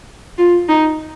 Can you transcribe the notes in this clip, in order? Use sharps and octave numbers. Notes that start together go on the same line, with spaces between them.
F4
D#4